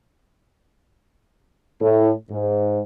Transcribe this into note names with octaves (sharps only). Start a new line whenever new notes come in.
A2
G#2